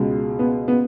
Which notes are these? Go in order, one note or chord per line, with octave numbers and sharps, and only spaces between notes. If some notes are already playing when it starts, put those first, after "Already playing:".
Already playing: C#2 B2 G#3
B3
B3